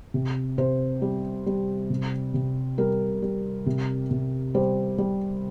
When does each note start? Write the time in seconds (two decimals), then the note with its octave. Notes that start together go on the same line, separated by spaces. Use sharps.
0.14 C3
0.58 C3 C5
1.02 G3
1.46 G3
1.90 C3
2.34 C3
2.78 G3 A#4
3.22 G3
3.66 C3
4.11 C3
4.55 G3 C5
4.98 G3